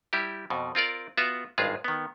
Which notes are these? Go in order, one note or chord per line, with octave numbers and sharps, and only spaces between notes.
G3 E4 G4
F2 B2
C4 F4 A#4 D5
B3 F4 F#4 E5
G#1 G2 G#3 F4 G#4
D#3 B3